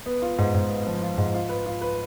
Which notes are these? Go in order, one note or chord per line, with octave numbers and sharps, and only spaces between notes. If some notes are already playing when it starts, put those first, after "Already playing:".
B3
F4
G#2
G#2
B3
F3
F4
G#2
F4
B4
F4
B4